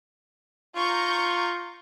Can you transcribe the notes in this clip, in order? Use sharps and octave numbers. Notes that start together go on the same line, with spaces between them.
F4 A#5 C#6 G6